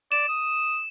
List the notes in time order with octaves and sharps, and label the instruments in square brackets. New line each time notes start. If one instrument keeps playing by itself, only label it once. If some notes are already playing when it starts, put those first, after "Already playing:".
[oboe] D5 [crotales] E7
[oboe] D#6